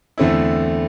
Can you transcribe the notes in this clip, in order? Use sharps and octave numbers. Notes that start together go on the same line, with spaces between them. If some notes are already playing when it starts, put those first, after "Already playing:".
E2 D3 A3 C4 E4